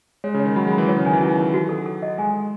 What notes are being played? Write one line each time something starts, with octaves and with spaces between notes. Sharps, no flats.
G#3 C#5
C#3
C#5
D#3
F#3 B5
G#3 B5
E3
F#3 C#5
C#3
D#3 G#5
E3
F#3 D#4
D#4
F#4
A4
A4
D#5
G#3 G#5
A4